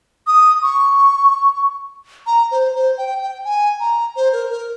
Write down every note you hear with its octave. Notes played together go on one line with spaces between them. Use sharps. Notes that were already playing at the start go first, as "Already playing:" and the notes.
D#6
C#6
A#5
C5
C5
G5
G5
G#5
A#5
C5
A#4
A#4